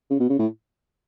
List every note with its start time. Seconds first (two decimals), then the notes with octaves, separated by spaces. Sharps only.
0.10 C#3
0.20 B2
0.29 C#3
0.39 A2